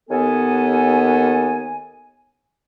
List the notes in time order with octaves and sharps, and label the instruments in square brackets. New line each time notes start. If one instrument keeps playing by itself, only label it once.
[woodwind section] D#2 B3 A4 G#5